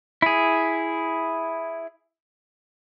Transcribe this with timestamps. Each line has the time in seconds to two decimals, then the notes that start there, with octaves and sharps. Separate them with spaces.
0.22 E4 G#4